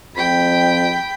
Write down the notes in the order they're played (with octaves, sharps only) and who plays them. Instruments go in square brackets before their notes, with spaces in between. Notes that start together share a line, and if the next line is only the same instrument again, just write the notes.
[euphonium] F2 [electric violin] G5 B5